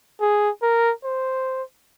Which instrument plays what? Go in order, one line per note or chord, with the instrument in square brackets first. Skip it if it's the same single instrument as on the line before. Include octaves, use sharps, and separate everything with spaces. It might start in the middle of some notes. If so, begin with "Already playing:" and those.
[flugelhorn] G#4
A#4
C5